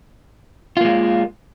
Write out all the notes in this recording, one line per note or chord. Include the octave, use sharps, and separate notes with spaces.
G#3 A#3 F4